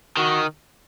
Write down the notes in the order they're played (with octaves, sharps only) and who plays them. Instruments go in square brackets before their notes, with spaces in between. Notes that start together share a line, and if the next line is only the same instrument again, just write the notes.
[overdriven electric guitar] D#3 [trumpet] F#4